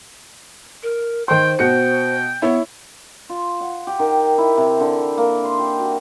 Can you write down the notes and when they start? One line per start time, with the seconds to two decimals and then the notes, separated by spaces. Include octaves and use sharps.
0.83 A#4
1.28 D#3 C5 G5 C6
1.59 B2 F#4 G5 C#7
2.42 B3 E4 C#5
3.29 F4
3.61 F#5
3.87 G4
3.99 D#3
4.38 E4
4.57 C3
4.80 D3
5.18 A#3
5.44 C6
5.59 G4
5.79 F#4